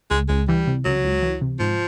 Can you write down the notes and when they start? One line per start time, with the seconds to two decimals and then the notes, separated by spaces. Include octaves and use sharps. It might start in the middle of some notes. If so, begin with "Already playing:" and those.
0.11 C#2 G#3
0.29 C#2 G#3
0.48 E3 G3
0.67 C3
0.85 C#2 F#3
1.04 C#2
1.23 E3
1.41 C3
1.60 G#2 F3